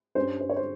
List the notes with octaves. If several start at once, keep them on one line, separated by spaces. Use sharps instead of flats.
G2 G3 C#4 C5
C5
C#5
C5